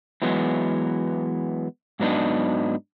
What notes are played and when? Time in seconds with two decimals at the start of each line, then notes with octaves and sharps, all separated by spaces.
0.22 E3 F#3 G#3 B3
2.00 G#2 F#3 B3 D4 D#4